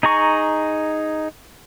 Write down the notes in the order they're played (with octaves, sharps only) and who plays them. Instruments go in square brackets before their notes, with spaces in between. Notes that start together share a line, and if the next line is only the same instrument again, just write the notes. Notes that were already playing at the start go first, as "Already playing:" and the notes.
[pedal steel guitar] D#4 G#4 A#5 C#6